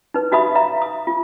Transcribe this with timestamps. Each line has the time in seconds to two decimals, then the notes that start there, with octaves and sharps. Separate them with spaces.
0.14 D#4 B4
0.32 D#4 F#4 E5 F5 B5 D#6
0.55 E5 F5 A#5
0.82 D#6
1.07 F4